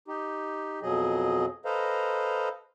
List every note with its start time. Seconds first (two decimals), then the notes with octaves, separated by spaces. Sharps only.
0.08 D#4 G4
0.82 F2 B2 F#3 G#4 D#5
1.65 A4 B4 C5 D#5 F5 A#5